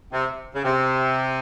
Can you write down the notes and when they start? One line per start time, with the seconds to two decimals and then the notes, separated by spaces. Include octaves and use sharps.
0.13 C3
0.54 C#3
0.64 C3